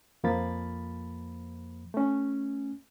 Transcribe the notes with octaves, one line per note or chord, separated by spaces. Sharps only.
F2 F3 A#3 B5 A6
A3 C#4